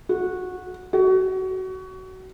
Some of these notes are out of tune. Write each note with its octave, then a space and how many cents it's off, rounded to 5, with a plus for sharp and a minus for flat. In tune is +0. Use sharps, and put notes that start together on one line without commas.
F#4 -15
F#4 +25